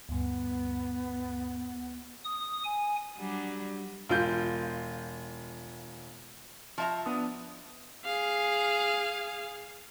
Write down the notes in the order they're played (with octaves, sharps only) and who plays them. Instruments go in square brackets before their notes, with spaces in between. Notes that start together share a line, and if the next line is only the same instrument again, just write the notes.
[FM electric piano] D2 G2 [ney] B3
[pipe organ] D#6
G#5
[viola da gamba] F#3 G3 D4
[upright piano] E1 F4 G6
[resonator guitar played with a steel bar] F3 E5 A#5
[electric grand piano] B3 D4 D#6
[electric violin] G#4 F5